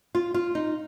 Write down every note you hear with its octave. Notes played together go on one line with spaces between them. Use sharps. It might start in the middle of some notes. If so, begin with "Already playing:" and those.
F4
F4
D#4